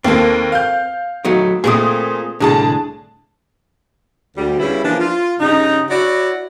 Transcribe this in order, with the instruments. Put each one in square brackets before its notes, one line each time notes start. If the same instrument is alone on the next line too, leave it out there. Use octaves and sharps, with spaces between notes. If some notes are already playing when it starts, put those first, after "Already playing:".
[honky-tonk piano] D#2 A#3 [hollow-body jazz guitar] C4 A4
[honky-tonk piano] F5 G6
[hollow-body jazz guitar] F#3 A3 D#4
[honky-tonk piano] A#2 D#6 [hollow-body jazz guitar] A3 C4 G#4
[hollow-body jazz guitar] C2 A2 D3 [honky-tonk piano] D4 G#4 A5
[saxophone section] D2 G3
C#3 G3 B3 E4
E3 F3 G3 A#3 D4
F4
G2 C#3 D#4
E4 F#4 C#5 D5